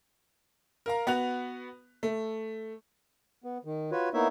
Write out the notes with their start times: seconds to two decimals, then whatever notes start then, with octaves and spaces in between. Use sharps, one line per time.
0.86 A#4 F5 A#5
1.07 B3 F#4 F#6 F7
2.03 A3
3.44 B3
3.65 D#3
3.92 F4 F#4 B4 C#5
4.14 A#3 B3 D#4 E4 C#5 E5